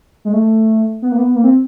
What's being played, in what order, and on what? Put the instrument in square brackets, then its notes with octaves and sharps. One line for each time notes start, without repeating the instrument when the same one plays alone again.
[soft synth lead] G#3
A3
B3
A#3
B3
A#3
C4